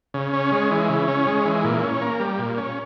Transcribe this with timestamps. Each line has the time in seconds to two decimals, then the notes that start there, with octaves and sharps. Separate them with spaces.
0.14 C#3
0.33 C#4
0.52 G#3
0.71 E3
0.89 C#3
1.08 C#4
1.27 G#3
1.45 E3
1.64 A#2
1.83 C#4
2.01 A#3
2.20 G3
2.39 A#2
2.58 C#4